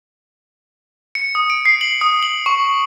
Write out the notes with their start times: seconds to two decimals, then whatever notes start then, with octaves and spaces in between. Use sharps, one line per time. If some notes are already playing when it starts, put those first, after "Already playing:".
1.15 C#7
1.35 D#6
1.50 D7
1.65 C7
1.81 F#7
2.01 D#6
2.23 F#7
2.46 C#6